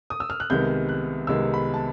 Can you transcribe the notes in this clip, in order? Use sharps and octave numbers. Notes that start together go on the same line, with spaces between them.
D#6
E6
F6
F#6
C2 C3 D#3 G#3 B3 G6
F#6
C2 C3 D#3 G#3 B3 E6
B5
A5